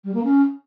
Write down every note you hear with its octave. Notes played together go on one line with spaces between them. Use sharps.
G3
A#3
C#4